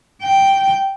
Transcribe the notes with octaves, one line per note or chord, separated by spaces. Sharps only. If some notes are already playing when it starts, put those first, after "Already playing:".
G5